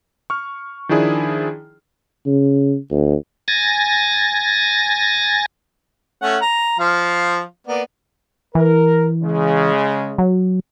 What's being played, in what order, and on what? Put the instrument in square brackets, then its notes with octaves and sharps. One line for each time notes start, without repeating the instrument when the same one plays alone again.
[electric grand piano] C#6 F6
D#3 F3 D4 E4 G#4 D5
[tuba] C#3
D2
[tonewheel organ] G#5 A6 A#6
[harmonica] A3 C#4 F#5
A#5
F3 F5
A#3 B3 D5
[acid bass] E3 [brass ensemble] A#4
[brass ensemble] C#3 G#3
[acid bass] F#3